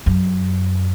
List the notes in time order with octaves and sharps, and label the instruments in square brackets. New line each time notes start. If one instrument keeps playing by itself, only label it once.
[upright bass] F#2